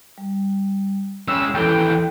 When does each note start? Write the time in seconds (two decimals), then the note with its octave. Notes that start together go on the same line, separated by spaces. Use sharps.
0.18 G3
1.28 G#3 C#4 G5 E6
1.54 D#2 E3 A4 G5